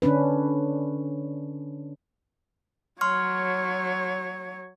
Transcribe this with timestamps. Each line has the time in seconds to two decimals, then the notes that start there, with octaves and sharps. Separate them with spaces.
0.02 D3 C#4 D4 B4
3.01 F#3 C#5 C6 C#6 F6